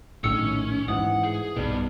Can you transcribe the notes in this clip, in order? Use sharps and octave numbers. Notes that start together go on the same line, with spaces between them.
A#1 A2 D#3 C#4 E6 C#7
G#2 E3 F#5 D#6
G#4
B1 G2 B2